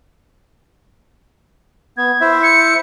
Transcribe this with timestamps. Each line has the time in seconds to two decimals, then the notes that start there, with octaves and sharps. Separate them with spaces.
1.97 B3 G#6
2.21 E4 C5 E5
2.43 C#7